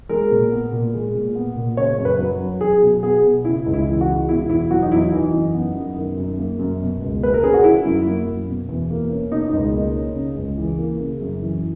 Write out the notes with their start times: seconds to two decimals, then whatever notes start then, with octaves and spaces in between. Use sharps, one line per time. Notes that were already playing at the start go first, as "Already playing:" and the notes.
0.09 G#3 A#4
0.31 A#2
0.52 B3
0.72 A#2
0.94 G#3
1.15 A#2
1.35 B3
1.56 A#2
1.77 C#3 C#5
1.98 F#2
2.05 B4
2.19 F#3
2.40 C#4
2.61 F#3 G#4
2.81 B2
3.03 B3 G#4
3.24 B2
3.45 C#3 E4
3.66 C#2
3.73 E4
3.87 E3
4.01 F#4
4.08 G#3
4.29 B2 E4
4.49 E2 E4
4.71 F#3 F#4
4.82 D#4
4.91 E2 E4
5.12 E3 D#4
5.33 F#2
5.54 B3
5.75 F#2
5.97 D#3
6.17 F#2
6.38 A#3
6.59 F#2
6.81 B2
7.01 C#2
7.22 A#3 B4
7.34 A#4
7.43 C#4 G#4
7.54 F#4
7.64 D#3 E4
7.86 F#2
8.06 A#3
8.27 F#2
8.48 B2
8.69 E2
8.90 A#3
9.11 C#4
9.31 B2 D#4
9.49 C#2 D#4
9.74 A#3
9.95 C#4
10.15 C#3
10.36 C#2
10.58 E3
10.78 A#3
11.00 C#3
11.21 F#2
11.42 E3